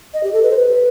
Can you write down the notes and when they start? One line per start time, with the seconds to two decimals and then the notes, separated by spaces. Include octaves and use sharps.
0.14 D#5
0.24 G4
0.33 A4
0.43 B4
0.50 C5
0.57 B4